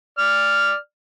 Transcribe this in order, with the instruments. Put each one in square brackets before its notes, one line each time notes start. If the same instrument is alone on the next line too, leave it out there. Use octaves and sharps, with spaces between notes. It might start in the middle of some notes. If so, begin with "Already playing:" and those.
[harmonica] D5 F6